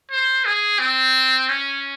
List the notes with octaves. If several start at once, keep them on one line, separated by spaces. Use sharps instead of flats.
C5
G#4
C4
C#4